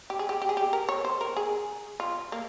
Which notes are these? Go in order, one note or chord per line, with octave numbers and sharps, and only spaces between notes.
G4
G#4
G4
G4
G#4
G4
A#4
C#5
C5
A#4
G#4
F4
A#3